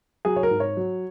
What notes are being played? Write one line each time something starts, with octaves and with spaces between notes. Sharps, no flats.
F#3 G#4
C#5
A#4
G#2
C#5
F#3